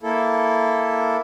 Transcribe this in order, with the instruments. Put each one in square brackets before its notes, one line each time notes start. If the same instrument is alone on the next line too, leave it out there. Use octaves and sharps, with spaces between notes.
[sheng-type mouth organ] A#3 E4 A4